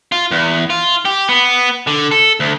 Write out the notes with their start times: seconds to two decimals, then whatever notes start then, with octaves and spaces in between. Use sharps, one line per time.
0.12 F4
0.31 E2
0.70 F4
1.05 G4
1.29 B3
1.87 D3
2.11 A4
2.40 D2